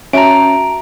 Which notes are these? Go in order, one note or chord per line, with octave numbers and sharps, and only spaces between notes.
C#4 F#4 E5 A5 A#5 D7